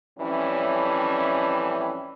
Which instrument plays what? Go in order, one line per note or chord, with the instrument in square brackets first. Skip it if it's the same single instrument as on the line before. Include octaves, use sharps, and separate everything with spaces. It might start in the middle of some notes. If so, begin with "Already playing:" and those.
[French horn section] F2 A2 E3 G3 C#4